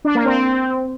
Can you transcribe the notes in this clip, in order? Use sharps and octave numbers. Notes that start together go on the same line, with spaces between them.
D4
A#3
C4